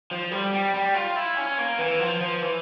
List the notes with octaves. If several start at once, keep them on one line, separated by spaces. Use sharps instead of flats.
F3
G3
G3
G3
F4
E4
C#4
A#3
E3
F3
F3
E3